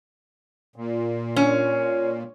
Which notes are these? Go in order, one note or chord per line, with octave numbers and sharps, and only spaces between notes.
A#2
C#4